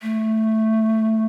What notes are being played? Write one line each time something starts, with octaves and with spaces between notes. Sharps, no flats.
A3